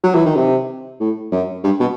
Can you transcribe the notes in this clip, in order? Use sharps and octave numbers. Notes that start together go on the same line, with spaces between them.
F#3
E3
D#3
C3
A2
F#2
G2
B2